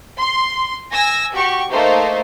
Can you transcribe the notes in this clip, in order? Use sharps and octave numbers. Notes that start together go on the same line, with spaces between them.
C6
G#5 E6 A#6
F#4 G4 C#6
A3 A#3 D#4 C5